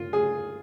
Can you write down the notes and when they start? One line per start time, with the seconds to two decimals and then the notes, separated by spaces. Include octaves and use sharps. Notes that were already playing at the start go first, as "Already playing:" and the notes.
Already playing: F4
0.13 G#4